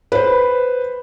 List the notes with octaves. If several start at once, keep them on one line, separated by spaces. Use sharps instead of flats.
B4 C5